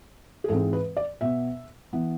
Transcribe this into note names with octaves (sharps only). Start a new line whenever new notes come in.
G#4
G#2 E3 G#3 C4 A4
B4
D5
B2 B3 E5
E3 B3